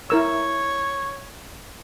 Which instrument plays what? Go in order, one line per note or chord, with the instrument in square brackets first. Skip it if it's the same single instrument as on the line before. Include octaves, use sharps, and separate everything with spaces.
[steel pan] E4 A#4 E6 [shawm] C#5